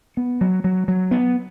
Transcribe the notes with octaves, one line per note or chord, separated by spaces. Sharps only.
B3
F#3
F#3
F#3
B3